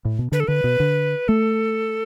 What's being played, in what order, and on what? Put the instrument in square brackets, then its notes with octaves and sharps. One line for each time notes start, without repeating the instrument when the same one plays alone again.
[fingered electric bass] A2
B2
[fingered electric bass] D3 [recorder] B4
[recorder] A4
[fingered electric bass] D3 [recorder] B4
[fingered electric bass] B2
D3
[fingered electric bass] A3 [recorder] A4